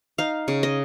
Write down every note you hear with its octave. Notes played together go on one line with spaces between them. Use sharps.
D#4 F5
C#3
D#5